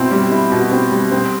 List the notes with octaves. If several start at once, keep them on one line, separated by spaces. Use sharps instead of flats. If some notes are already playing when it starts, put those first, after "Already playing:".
Already playing: B2 C4 E4
G3
E4
B2
C4
G3
C4